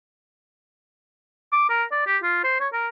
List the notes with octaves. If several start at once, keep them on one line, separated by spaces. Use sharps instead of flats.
D6
A#4
D5
G4
F4
C5
C#5
A#4